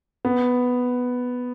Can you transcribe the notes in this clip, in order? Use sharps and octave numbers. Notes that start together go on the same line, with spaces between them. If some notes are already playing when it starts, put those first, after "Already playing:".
B3